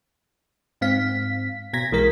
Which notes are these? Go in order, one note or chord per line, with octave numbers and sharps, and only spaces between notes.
G#2 C4 F5 B6
B2 G#6 A#6 B6
B1 E3 G#3 A#4 B6